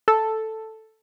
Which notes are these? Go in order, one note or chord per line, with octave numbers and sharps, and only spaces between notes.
A4